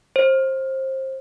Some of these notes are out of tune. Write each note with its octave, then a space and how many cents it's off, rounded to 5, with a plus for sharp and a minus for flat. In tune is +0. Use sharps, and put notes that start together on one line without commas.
C5 +25